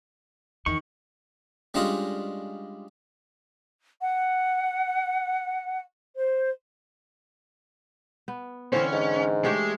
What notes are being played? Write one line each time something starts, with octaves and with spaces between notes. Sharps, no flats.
E2 D#3 C#6
G3 G#3 C#4 D4 F4 D#5
F#5
C5
B3
D3 E3 C4 C#4 C5
G#2
G#3 A3 G4 C#5